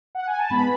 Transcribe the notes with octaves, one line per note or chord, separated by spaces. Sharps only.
F#5
G#5
A5
G#2 G#3 B3 B5